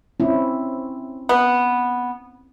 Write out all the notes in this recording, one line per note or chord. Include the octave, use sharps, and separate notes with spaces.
C4 C#4 E4
B3